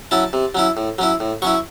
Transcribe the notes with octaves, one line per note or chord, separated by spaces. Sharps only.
F#3 C#4 E4 A5
C3
F#3 C#4 E4
A2
F#3 C#4 E4
A2
F#3 C#4 E4 C#6